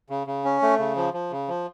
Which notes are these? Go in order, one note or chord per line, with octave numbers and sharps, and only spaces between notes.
C#3
C#3
C#4
A3
C#3
F3
F3
C#3
F3